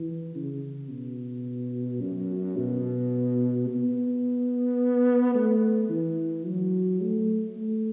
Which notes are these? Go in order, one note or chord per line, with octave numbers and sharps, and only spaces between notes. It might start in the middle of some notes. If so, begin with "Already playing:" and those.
Already playing: E3
C#3
B2
F#2
B2
B3
A3
E3
F#3
A3
A3